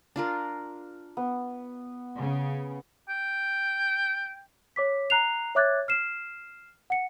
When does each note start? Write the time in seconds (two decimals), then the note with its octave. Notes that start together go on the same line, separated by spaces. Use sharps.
0.16 D4 F4 A#4
1.17 B3
2.18 C#3
3.09 G5
4.76 C#5 D6 B6
5.10 A#5 F#6 C7 F7
5.55 C#5 E5 D6 F#6 G#6 A6
5.88 F6 C7 E7
6.90 F#5 C#7